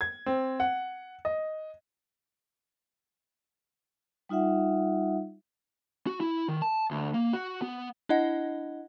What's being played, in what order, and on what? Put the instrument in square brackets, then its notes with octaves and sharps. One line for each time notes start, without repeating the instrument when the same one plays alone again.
[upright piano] G#6
C4
F#5
D#5
[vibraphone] G3 D#4 F4 E5 F#5
[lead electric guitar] F#4
E4
D#3
A5
D2
A#3
F#4
B3
[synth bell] D4 E4 D#5 F#5